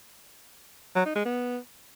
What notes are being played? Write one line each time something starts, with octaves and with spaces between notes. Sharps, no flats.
F#3
D#4
G#3
B3